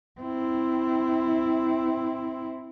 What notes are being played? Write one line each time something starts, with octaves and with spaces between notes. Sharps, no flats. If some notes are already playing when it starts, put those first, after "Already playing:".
C4 E4